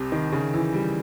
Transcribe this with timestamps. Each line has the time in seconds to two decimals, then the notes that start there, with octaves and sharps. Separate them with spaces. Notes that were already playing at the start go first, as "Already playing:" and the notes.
Already playing: C2 C3
0.12 D#3
0.33 C#3
0.54 E3
0.74 G3